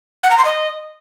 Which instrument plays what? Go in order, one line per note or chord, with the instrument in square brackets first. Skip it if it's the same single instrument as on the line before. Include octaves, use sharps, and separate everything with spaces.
[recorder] F#5
A#5
C6
D#5